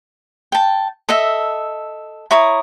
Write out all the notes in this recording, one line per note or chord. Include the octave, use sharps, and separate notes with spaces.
G5 A5
A4 D#5 E5
E4 C#5 A#5 D#6